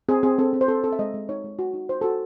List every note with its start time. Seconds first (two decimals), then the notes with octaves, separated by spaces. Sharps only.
0.09 C4 G#4
0.23 C4 G#4
0.38 C4 A4
0.53 C4
0.61 C5
0.68 C4 A4
0.84 C4 A4
0.92 E5
0.99 G#3 D#5
1.14 G#3
1.29 D#4 C#5
1.44 G#3
1.59 F#4
1.74 D#4
1.89 D#4 C5
2.01 F#4 A4